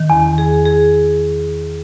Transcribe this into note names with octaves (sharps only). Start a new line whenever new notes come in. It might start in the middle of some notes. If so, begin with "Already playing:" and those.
Already playing: D#3
E2
G#4
G#4